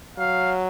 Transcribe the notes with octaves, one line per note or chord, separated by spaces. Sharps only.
F#3 F5